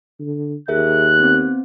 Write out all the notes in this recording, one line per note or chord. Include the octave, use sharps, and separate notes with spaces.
D3
D#2 G#4 A#4 E5 F#6
B3 C4